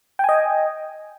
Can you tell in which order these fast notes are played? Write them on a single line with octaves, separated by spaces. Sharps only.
G5 G#5 D#5